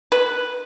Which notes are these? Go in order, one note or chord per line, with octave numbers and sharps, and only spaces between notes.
B4